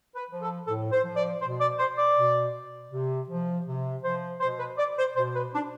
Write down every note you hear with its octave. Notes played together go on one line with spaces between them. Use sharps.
B4
F3
A4
A2 A4
C5
F3
D5
B2 C5
D5
C5
D5
B2
C3
F3
C3
F3 C5
B2 C5
B4
D5
C5
B2 C5
B4
D4